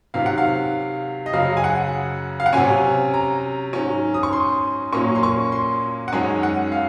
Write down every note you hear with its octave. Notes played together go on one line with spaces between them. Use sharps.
C3 D#3 F#3 F5
F#5
F5
D#5
F#2 C#3 F#3 F5
G#5
F#5
F5
F#5
C3 F#3 C#4 G#5
A#5
G#2 F#3 C#4
D#6
C#6
C6
A#2 F#3 A#3 C#4 C#6
C6
C#6
C6
F#5
F#2 D#3 G#3 C#4 G#5
F#5
F5